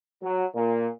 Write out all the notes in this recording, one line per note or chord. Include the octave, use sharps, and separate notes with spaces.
F#3
A#2